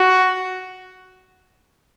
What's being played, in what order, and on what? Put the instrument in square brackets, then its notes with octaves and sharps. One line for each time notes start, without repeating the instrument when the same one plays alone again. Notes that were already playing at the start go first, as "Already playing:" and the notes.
Already playing: [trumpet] F#4